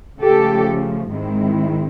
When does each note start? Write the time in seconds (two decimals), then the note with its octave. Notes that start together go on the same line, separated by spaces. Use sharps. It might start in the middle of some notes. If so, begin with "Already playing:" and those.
0.21 C#3 F3 A3 G4 A4
1.10 G#2 D#3 G#3 C4 E4